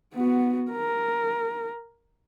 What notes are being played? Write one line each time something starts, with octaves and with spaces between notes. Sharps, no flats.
B3 F#4
A#4